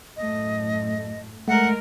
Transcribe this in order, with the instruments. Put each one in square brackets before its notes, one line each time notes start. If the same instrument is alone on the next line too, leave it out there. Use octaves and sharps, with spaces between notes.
[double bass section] F#2 A2 A3 [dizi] D#5
[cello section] G#3 A#4 [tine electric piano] A3 [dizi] F#5